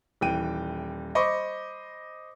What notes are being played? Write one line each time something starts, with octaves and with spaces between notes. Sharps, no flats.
D#1 E3 G5 D#7
C5 D#5 B5 C#6 D6